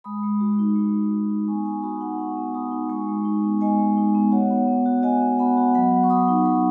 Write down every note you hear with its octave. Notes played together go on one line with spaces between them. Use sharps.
G#3 B5 D#6
G#3
F#4
D#4
G#3
G#3
F#4
D#4
B3 G#5 C#6
B3 G#5 C#6
F#4 B5 D#6
D#4 F#5 B5
B3 G#5 C#6
B3
F#4 B5 D#6
D#4
G#3 G#5 C#6
G#3
D#4
B3
G#3 D#5 G#5
G#3
D#4
B3
F#4 C#5 F#5
B3
B3
F#4
F#4 D#5 G#5
B3
B3 F#5 B5
F#4
F#3 F#5 B5
F#3
C#6
F#4 B5 D#6
D#4
C#6
F#3 B5 D#6